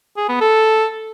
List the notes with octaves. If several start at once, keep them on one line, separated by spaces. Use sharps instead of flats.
G#4
B3
A4